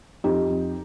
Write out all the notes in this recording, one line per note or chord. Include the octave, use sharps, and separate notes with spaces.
F2 D#4 G4
F2